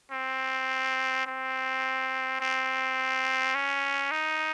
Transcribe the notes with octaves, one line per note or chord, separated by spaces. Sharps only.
C4
C4
C4
C#4
D#4